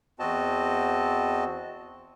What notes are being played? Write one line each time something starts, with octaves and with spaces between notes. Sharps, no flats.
E2 C4 F#4 D#5 A5